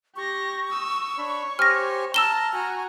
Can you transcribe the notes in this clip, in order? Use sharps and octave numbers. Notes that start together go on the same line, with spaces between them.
G4 C#6 A#6
D#6 E6
D4 C#5 B5
G4 C5 G#5 F6 A#6
A5 A#5 E6 F6 E7 G7
F#4 G#5 A#5